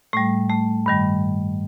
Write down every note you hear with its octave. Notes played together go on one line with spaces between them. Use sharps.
A2 G3 A3
A3
G2 D#3 G3